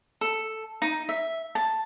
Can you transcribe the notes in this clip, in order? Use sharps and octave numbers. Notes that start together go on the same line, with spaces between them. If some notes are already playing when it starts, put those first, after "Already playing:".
A4
D#4
E5
A5